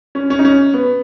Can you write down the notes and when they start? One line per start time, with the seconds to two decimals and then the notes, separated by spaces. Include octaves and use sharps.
0.15 C#4
0.30 C#4
0.39 D#4
0.45 C#4
0.74 B3